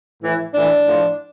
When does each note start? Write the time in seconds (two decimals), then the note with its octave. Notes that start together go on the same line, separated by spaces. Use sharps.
0.21 A2 E3
0.53 A2 E3 D4
0.85 A2 F3